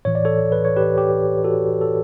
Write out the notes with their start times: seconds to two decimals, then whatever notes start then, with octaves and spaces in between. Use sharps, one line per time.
0.05 A2 E3 C#5
0.15 D5
0.25 A4 C#5
0.52 B4
0.65 C#5
0.76 G4 B4
0.98 G4
1.44 F#4 A4
1.81 A4